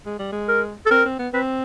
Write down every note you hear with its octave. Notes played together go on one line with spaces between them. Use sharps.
G#3
G3
G#3
A#4
A4
C4 A#4
C4
B3
C4 B4